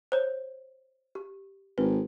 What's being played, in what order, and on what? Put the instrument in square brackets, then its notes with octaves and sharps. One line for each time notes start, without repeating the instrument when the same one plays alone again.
[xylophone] C5 C#5
G4
[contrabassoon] G#1 [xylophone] B4